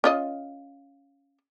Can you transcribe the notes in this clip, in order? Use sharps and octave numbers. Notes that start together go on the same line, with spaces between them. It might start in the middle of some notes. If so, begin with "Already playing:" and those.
C#4 F4 D#5